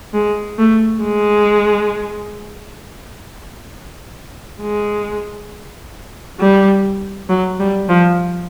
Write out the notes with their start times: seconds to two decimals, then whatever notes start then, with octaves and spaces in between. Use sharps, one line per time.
0.14 G#3
0.58 A3
1.03 G#3
4.61 G#3
6.40 G3
7.30 F#3
7.59 G3
7.89 F3